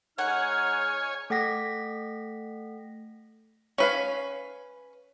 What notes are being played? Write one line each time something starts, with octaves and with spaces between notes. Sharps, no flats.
G#3 D#4 C#5 F#5 G#5 F6
A3 A4 F#5 G5 A#6 B6
C#4 B4 F5